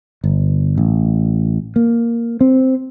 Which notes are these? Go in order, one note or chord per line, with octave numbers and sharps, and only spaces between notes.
G1
A1
A#3
C4